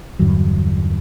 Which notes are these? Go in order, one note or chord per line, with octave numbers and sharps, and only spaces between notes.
E2 G2 D3 F#3